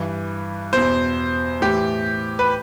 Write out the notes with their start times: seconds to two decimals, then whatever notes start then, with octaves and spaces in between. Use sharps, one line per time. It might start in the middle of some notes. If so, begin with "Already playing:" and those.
Already playing: G2 E3
0.73 E2 B2 C5
1.61 A2 E3 G4
2.39 B4